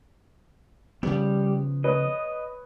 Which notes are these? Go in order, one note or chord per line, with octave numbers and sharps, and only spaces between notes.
C#3 F3 G3 B3
B4 C#5 D#5 D#6